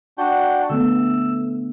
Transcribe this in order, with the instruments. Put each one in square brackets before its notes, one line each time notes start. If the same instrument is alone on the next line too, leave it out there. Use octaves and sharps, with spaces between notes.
[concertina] D4 F#4 G5
[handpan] D3 A3 B3 [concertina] E6